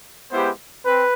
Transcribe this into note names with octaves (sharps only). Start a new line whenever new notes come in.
G#3 B3 E4 G4 C5
C4 B4